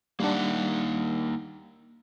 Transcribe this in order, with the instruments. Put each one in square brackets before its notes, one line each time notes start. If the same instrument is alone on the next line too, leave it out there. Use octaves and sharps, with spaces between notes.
[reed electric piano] G3 D4 [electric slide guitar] A#3 D#4 F#5